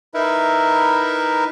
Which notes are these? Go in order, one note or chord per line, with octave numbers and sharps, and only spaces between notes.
D#4 E4 A#4 B4 E5